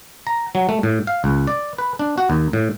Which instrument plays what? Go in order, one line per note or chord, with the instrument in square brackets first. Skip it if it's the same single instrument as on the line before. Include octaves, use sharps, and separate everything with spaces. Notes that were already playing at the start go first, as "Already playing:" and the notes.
[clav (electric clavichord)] A#5
F#3
A3
A2
F5
C#2
D5
B4
D4
F#4
D#2
A2